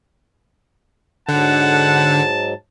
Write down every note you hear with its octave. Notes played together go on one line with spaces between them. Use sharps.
G#2 D3 F#3 F#5 A5